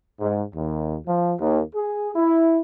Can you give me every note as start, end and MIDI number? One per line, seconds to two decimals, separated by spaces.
0.20 0.44 44
0.55 0.97 39
1.06 1.34 53
1.39 1.61 39
1.75 2.09 68
2.16 2.61 64